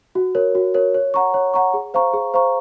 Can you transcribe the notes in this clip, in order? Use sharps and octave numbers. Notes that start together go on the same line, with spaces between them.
F#4
A#4 C#5
F#4
A#4 C#5
C#5
F#5 A#5 C#6
C#5
F#5 A#5 C#6
G#4
C5 F5 A#5 C#6
G#4
C5 F5 A#5 C#6